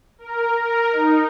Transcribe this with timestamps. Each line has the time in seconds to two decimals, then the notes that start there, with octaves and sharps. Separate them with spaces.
0.18 A#4
0.61 A#4
0.92 D#4